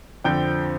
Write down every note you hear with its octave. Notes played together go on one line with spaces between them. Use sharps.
F2 D3 F3 C4 G5 G6